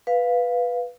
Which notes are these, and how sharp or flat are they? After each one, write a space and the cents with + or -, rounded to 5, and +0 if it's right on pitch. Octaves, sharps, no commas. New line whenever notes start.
B4 +0 F5 +0